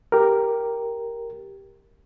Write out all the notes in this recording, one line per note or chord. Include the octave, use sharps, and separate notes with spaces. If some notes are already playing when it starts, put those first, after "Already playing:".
G4 A#4